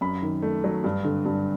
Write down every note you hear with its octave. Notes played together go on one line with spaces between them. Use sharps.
F#2 B5
D#3
A3
F#3
G2
D3
G2